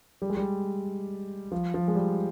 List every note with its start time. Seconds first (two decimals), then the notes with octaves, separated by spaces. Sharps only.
0.22 G3
0.30 G#3
0.37 G3
1.52 F3
1.74 F3
1.88 G#3
1.95 G3